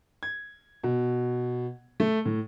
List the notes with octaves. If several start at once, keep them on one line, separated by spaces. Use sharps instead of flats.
G#6
B2
A3
A2